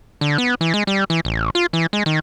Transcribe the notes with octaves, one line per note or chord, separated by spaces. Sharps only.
D3
B3
E3
G#3
G3
E3
A1
F4
E3
G#3
D#3